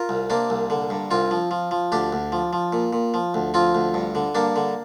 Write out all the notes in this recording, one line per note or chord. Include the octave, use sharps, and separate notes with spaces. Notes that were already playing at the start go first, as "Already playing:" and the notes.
Already playing: F4 A#4
C2
C3 A#3 D4
C2
D3
G2
C2 C4 F4
F3
F3
F3
D2 D4 G4
D2
F3
F3
A#2
A#2
F3
D2
F3 C4 F4
D2
G2
D3
G2 A#3 D4
D3